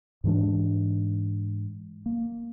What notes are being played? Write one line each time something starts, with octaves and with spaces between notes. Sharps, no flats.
G#2 E3 G#3 D4
A#3